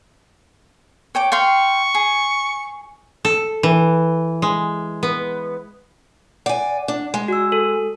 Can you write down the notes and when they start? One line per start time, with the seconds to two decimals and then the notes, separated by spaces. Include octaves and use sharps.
1.15 C#5 G5 D6
1.32 F5 G5 C6 C#6
1.95 G#4
3.25 A4
3.63 E3
4.42 G#3
5.03 B3
6.46 D5 F#5 G#5
6.88 D4
7.14 G#3
7.28 F#4 E6
7.52 A4